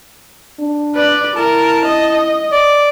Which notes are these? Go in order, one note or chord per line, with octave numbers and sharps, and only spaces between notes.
D4
B4 D5
E4 A#4 A5
D#5
D5